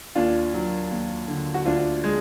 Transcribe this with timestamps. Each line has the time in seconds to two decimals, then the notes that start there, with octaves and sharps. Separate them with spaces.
0.15 D#2 D4 F4
0.54 F#3
0.91 D#2
1.28 D3
1.54 F#4
1.65 D2 D4 F4
2.04 G#3